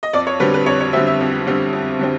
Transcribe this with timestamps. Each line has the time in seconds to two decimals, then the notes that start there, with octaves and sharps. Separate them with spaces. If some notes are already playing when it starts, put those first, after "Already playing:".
0.03 D#5
0.13 F2 D5
0.27 C#5
0.40 D3 G3 C4 B4
0.54 B4
0.66 F2 C#5
0.80 C#5
0.93 D3 G3 C4 E5
1.07 E5
1.20 F2
1.47 D3 G3 C4
1.73 F2
1.99 D3 G3 C4